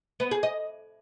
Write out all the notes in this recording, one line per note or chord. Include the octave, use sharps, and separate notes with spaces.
B3
G#4
D#5